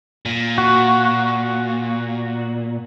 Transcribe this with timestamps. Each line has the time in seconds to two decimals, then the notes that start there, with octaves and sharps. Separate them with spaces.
0.26 A#2
0.58 F#4